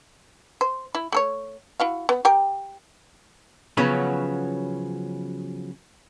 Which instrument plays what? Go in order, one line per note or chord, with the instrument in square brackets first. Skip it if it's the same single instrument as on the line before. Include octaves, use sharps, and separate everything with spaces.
[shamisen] C5
E4
A3 A4 C#5
E4 F#4 F5
B3
G4 A#4 G5
[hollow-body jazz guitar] C#3 F3 F#3 B3 C#4